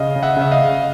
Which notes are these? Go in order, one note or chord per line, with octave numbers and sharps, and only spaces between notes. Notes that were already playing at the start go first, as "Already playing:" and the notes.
Already playing: C#3 D#5 F5
C#3
E5 F#5
C#3
E5
D#5 F5
C#3